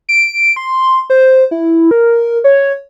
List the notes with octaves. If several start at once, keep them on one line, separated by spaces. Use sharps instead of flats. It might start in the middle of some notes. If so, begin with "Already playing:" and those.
D7
C6
C5
E4
A#4
C#5